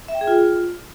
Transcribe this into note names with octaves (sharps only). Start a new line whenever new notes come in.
E5
G5
G#4
F4